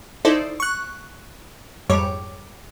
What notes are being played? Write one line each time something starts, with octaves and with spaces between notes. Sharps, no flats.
D#4 E4 A4 C5 D5
C#6 F#6
F2 G#2 G3 C#5 D6